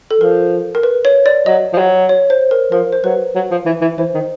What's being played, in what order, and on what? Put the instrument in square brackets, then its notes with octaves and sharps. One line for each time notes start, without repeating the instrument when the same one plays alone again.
[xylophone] A4
[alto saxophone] F3 [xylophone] A#4
[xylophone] A#4
B4
C#5
D5
[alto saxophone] F#3 [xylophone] D#5
[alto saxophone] F3
F#3
[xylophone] C#5
C5
A#4
[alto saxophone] F3 [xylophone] A#4
[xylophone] C5
[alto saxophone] F#3 [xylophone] B4
[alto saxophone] F#3
F3
E3
E3
[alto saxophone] E3 [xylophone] C5
[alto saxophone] D#3